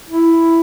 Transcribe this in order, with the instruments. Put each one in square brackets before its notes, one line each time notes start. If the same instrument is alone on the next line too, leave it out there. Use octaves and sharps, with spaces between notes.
[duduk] E4